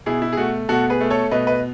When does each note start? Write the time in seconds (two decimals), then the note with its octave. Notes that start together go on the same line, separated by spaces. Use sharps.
0.06 B2 E4 G#4
0.22 E4
0.33 G#4
0.37 A3 F#4
0.69 B2 F#4 A4
0.90 G#4 B4
1.01 A3
1.10 A4 C#5
1.31 B2 B4 D#5
1.47 B4 D#5